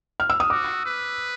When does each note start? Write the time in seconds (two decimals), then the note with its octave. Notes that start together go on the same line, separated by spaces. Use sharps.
0.20 F6
0.30 E6
0.40 D#6
0.50 F#4 D6
0.86 B4